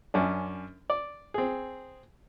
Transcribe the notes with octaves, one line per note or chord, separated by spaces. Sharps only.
F#2 C#4 D4
D5
C4 G#4